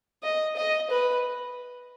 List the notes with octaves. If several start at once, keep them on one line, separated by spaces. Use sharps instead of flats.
D#5
D#5
B4